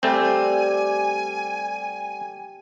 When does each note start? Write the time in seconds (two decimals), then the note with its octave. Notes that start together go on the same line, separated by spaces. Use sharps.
0.03 G3 A3 C4 G#5